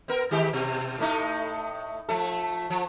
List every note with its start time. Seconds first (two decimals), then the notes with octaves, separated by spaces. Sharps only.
0.08 B3 A#4
0.31 D#3 G#3 G4
0.53 B2
0.98 A2 A3 D#4
2.09 F3 A3 A4
2.70 F3